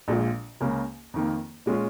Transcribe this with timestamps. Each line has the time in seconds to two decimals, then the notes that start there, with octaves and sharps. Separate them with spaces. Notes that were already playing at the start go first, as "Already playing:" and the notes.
0.08 A#1 A#2 G#3 F4
0.61 C#2 C#3 A#3 C#4
1.14 F2 D#3 A#3
1.66 A#2 G#3 C#4 F4